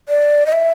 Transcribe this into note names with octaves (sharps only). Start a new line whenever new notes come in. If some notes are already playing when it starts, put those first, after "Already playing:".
D5
D#5
E5